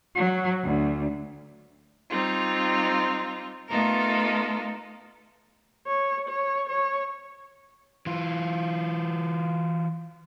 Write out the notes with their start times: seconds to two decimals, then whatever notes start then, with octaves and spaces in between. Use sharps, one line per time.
0.15 F#3
0.63 D2
2.10 G3 C4 D#4 F4
3.68 A3 B3 D#4 F4 A4 A#4
5.87 C#5
6.29 C#5
6.69 C#5
8.06 E3 F4